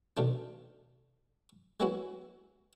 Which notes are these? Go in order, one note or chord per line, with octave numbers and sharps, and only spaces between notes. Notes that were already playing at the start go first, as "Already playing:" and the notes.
B2 D#3 A3 D4
G#3 A#3 B3 C#4 E4 F#4